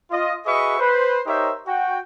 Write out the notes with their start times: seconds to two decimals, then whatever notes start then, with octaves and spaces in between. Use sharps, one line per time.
0.10 F4 D#5
0.45 F#4 G#4 B4 D#5 E5 C#6
0.79 B4 C5
1.26 D#4 G4 A#4 C5 C#5 E5
1.66 F#4 G5